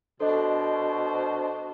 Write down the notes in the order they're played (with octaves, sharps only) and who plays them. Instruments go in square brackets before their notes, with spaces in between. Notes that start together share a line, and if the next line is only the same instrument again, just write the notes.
[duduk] B2 [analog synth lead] D4 [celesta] A4 D#5 [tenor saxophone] C5